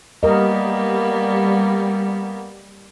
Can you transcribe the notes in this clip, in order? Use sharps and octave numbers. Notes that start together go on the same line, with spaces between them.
G3 A#3 B3 A#4 D#5